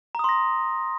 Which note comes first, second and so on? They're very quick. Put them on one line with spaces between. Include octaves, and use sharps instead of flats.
A#5 D#6 C6 A#6